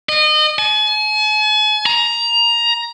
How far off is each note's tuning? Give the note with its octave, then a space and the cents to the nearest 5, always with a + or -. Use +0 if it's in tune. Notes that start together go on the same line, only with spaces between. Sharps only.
D#5 -30
G#5 +45
A#5 +15